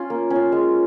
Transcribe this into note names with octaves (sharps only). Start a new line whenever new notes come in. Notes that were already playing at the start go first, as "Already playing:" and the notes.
Already playing: C#4 F4
A#3
C#4
F4
G#3